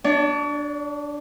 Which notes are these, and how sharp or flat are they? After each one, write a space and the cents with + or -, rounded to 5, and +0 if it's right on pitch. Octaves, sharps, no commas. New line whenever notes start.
D4 +0 C#5 +45